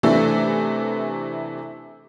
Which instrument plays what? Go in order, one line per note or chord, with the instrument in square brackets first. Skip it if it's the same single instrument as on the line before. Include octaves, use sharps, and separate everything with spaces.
[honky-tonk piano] C3 E3 A3 D4 A4